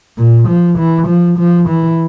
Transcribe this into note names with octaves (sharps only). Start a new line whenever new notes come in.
A#2
F3
E3
F3
F3
E3